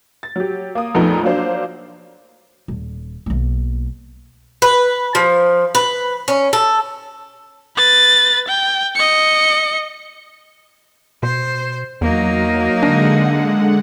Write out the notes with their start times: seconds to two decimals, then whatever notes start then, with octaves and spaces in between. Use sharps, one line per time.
0.23 A6
0.36 F#3 G4
0.75 A#3 D#6
0.95 A#1 F2 A3 B3 D#4 A#4
1.23 F#3 A#3 D4 C5 F5
2.68 D#1
3.26 B1 A#3
4.62 B4
5.15 F3
5.75 B4
6.28 C#4
6.53 A4
7.76 B4 A6
8.48 G5
8.95 D#5 C#7
11.23 B2 C5
12.01 E2 F#3 A#3 D#4
12.83 D3 G#3 D4 F#5